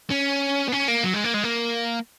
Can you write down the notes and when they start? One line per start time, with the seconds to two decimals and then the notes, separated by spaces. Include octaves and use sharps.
0.11 C#4
0.68 B3
0.72 C#4
0.88 A#3
1.04 F#3
1.13 G#3
1.24 A#3
1.34 G#3
1.43 A#3